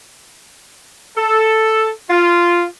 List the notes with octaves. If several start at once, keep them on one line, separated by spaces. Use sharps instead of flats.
A4
F4